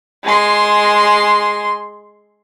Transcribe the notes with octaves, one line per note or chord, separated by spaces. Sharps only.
G#3 C6